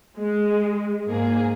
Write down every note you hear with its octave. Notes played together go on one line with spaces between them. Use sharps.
G#3
G#2 A#3 G#4